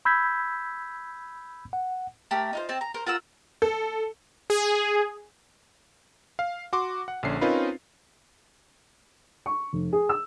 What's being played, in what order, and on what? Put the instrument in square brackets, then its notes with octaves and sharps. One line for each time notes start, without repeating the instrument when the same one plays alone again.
[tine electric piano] B5 E6 G6 G#6 B6
F#5
[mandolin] A3 G4 A#4
D#4 F4 C5
C4 A5
A#5
A#4 C5
F4 A#4 F#5 E6
[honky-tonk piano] A4
[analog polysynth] G#4
[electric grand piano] F5
F#4 C6 D6
F#5
A#1 D3 C#4 C7
C4 C#4 D#4 F4 A#4 B4
[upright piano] C#6
F1
G#4
E6